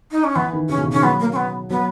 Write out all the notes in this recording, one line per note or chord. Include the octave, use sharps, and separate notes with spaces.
D#4
C#4
E3 B3
D#3
C#3 C#4
B2
C#3
D#3 C#4
F#3 B3
A#3
C#4
B3
F#3 B3